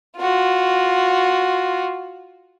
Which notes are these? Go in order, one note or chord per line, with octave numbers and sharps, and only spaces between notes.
F4 F#4